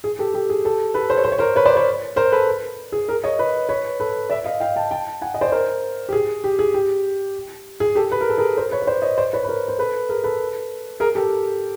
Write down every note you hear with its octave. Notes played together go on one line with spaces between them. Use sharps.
G#4
G4 A4
G4 A4
G#4
G4 A4
A4 B4
C5
C#5
C5
C#5
A#4 C5
B4 C#5
C5 D5
B4 C#5
A#4 C5
A4 B4
G#4
G#4 A#4
C#5 D#5
B4 C#5
B4 C#5
A4 B4
D5 E5
D#5 F5
F5 G5
G5 A5
G5 A5
F#5 G#5
D#5
C5 D5
A#4 C5
G4
G#4
G4
G#4
G4
G#4
G4 A4
B4
A#4
A4
G#4 A#4
A#4 C5
B4 C#5
C#5
C5 D5
C#5 D#5
C5 D5
B4 C#5
B4
A#4 C5
C5
A4 B4
G#4 A#4
A4 B4
G#4 A#4
G4 A4